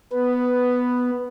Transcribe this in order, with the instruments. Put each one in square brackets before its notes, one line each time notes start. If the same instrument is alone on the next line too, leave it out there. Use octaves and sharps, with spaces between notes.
[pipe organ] B3 [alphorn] B4